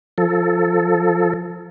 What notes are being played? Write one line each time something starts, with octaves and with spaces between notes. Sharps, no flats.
F3 A4